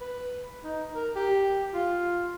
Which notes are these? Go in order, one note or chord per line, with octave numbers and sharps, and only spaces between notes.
B4
D#4
A#4
G4
F4